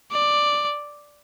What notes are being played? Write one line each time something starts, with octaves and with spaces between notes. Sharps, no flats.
D5